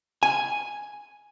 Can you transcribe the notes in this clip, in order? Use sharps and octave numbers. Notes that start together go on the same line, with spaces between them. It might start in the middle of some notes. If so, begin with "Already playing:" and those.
G#5